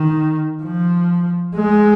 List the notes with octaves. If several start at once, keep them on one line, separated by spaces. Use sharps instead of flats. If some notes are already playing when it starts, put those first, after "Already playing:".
Already playing: D#3
F3
G#3